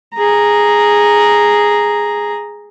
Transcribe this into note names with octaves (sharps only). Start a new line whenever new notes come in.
G#4 A#5